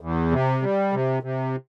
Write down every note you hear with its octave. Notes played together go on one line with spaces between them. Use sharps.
E2
C3
G3
C3
C3